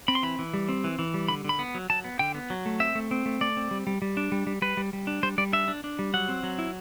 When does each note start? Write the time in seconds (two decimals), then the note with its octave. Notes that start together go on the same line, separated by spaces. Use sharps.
0.08 C4 B5
0.15 C6
0.23 E3 B5
0.39 E3
0.54 G3
0.69 C4
0.84 E3
0.99 E3
1.14 G3
1.28 D3 B5
1.44 D3 B5
1.59 B3
1.75 F#3
1.90 F#3 A5
2.04 B3
2.19 D3 G5
2.35 B3
2.50 F#3
2.66 A3
2.80 C4 E5
2.95 A3
3.11 C4
3.26 A3
3.41 A3 D5
3.57 C4
3.71 G3
3.87 G3
4.02 G3
4.17 D4
4.32 G3
4.47 G3
4.62 G3 B4
4.77 G3
4.93 G3
5.07 D4
5.23 G3 C5
5.38 G3 D5
5.52 D4 E5
5.68 D4
5.84 D4
5.99 G3
6.14 F#3 F#5
6.28 C4
6.43 F#3
6.59 E4